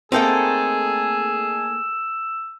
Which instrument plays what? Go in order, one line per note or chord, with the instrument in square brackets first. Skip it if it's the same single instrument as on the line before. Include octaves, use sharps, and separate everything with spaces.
[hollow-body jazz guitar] A3 A#3 C4 [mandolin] D#4 A4 G5 [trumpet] G#4 [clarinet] E6